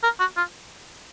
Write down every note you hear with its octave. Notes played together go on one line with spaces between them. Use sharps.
A#4
F#4
F4